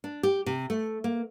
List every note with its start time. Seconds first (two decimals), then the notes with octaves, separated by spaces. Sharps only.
0.04 D4
0.23 G4
0.46 C3
0.70 A3
1.04 A#3